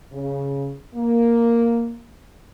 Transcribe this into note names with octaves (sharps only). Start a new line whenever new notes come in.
C#3
A#3